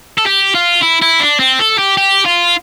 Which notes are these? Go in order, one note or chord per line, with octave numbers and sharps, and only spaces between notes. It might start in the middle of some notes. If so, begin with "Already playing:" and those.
A4
G4
F4
E4
E4
D4
C4
A4
G4
G4
F4